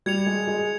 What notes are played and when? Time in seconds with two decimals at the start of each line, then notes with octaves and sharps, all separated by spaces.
0.06 G3 G#6 C#7 F7
0.26 G#3
0.48 G#3